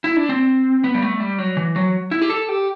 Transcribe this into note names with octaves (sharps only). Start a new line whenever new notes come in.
E4
D4
C4
B3
G3
A3
G3
F#3
E3
F#3
E4
G4
A4
G4